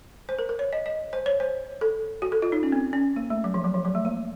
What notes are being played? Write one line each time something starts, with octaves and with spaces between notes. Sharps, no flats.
C5
A#4
A#4
C#5
D#5
D#5
C5
C#5
C5
A4
F#4
A4
F4
D#4
C#4
C4
C#4
A#3
A3
F#3
F3
F#3
F3
F#3
A3
A#3